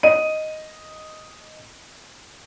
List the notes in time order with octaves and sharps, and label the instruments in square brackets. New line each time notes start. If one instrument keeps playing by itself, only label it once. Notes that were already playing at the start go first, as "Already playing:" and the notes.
[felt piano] D#5 D#7